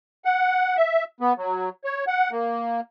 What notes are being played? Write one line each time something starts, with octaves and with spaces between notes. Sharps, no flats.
F#5
E5
B3
F#3
C#5
F#5
A#3